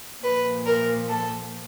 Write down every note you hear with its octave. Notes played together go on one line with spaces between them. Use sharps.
A#2 F3 B4
A#4
A4